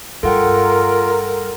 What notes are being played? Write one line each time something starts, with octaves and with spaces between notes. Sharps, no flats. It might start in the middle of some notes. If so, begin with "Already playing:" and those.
G2 F4 A4 A#4 F#5 G5